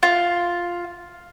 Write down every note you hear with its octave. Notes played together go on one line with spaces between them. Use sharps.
F4